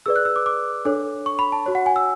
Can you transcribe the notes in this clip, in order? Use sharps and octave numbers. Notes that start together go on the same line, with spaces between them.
G#4 B4 D5 E6
F#6
E6
D6
D6
D4 A4 C#5
C#6
B5
A5
F#4 C#5
F#5
G#5
E6